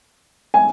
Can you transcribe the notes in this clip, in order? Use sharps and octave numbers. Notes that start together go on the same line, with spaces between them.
G#5